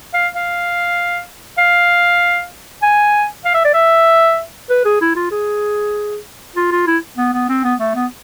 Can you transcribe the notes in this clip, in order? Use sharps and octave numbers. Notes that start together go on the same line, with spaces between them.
F5
F5
F5
G#5
F5
E5
D5
E5
B4
G#4
E4
F4
G#4
F4
F4
E4
B3
B3
C4
B3
A3
B3